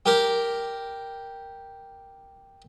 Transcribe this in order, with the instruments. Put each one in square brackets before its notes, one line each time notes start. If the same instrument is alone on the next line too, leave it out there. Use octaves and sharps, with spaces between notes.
[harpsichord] G4 A#4 A#5